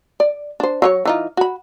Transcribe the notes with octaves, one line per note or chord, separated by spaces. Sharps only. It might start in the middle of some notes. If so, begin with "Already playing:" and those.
D5
D4 C5
F#3 F4 C#5
E3 D#4 F4
F#4 B5